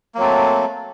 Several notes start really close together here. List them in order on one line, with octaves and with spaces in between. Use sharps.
A#3 F#3 C4 A3